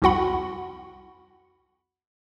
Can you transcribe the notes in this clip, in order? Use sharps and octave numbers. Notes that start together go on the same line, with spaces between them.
C2 F2 F#4 F#5 B5